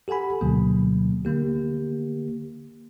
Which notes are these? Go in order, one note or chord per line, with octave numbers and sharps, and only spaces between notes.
G4 A4 F#5 G#5 B5
D2 B2 D3 F#3 A#3
D3 A#3 G4